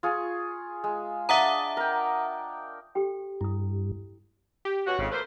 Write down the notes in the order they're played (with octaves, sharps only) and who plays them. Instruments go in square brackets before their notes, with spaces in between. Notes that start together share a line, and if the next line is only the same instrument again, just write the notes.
[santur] F4 G#4 C#6
G#3
[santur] D4 D#5 D6 [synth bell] E5 F#5 A#5
[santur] A#4 G5
[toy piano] G4 A4 G5
[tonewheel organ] G2 [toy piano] E4 D#6
[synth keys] G4
[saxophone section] B2 C#4 F#4
[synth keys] G#1 [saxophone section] F2 C#3
[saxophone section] A3 A#3 C5 [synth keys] B4